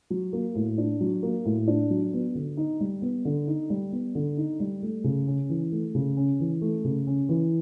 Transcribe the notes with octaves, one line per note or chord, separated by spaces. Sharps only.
F#3
A#3
A2
D4
F#3
A#3
A2
D4
F#3
B3
D3
D#4
G3
B3
D3
D#4
G3
B3
D3
D#4
G3
A3
C#3
C#4
E3
A3
C#3
C#4
E3
A3
C#3
C#4
E3